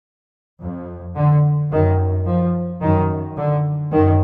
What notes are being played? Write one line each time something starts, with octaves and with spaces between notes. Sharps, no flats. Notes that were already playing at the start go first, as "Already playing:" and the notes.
F2
D3
F#2 D#3
F3
F#2 D#3
D3
F#2 D#3